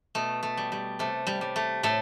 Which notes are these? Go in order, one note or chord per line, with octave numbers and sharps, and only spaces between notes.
B2 A3
A3
G3
G3
C3 A3
G3
G3
A3
A2 A3